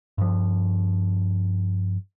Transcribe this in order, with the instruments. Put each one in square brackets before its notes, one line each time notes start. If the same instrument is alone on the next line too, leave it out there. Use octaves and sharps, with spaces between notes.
[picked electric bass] G2 F3